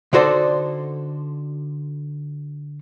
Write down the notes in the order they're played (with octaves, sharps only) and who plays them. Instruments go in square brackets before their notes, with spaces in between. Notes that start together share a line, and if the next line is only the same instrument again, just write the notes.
[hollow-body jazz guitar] D3 D#4 F#4 A4 C5 D5